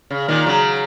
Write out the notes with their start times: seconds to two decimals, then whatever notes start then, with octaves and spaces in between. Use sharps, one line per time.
0.11 C#3
0.28 A#2 D#3
0.46 C#3 F#3